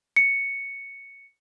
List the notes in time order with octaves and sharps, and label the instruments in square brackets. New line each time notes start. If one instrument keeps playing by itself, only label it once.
[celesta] C#7